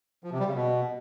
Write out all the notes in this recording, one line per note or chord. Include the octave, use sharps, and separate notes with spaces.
F3
C3
G3
C#3
B2